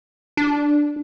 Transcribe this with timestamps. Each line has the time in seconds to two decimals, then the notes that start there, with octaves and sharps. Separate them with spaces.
0.37 D4